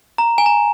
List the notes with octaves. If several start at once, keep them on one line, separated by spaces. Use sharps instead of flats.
A#5
G#5
A#5